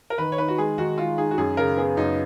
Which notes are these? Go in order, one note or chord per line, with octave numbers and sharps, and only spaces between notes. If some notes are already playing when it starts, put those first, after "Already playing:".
A#4
D#3 B4
C#5
D#4 B4
F#4
G#3 G#4
D#3 F#4
G#3 F4
D#4 G#4
F#4
F#2 G#4
C#3 A#4
B3 G#4
F#2 D#4